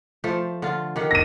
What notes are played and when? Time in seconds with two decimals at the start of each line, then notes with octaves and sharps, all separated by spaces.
0.24 F3 A3 C5
0.62 D3 F4
0.96 D#3 G4 F#5
1.11 A#6 D#7